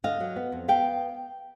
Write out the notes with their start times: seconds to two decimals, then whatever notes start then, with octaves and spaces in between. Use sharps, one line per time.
0.04 D3 D#5 F5
0.20 F#3
0.36 B3
0.52 F2
0.68 B3 F5 G5